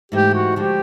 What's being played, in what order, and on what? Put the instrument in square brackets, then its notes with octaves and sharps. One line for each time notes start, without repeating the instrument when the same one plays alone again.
[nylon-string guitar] G#2 E3 A3 [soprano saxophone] G4
[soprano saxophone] F#4
[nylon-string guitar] D3 F3 G#3 [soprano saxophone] G4